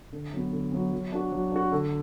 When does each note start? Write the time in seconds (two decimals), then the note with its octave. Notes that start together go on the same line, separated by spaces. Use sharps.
0.12 D3
0.33 F#3 B3
0.53 D3
0.72 F#3 B3
0.92 F#3
1.12 D4 F#4
1.32 F#3
1.52 D4 F#4
1.72 D3